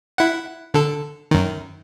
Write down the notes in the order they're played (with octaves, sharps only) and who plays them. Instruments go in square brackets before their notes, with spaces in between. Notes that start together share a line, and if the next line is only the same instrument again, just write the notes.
[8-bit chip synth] E4 F#5
D3 A4
F#2 D#3